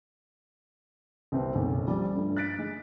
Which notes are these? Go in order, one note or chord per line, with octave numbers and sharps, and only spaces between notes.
C2 B3 C4
F#1 B1
F3 G3 D5
G2 A3 D4
F#6 A6 B6 D7
G#3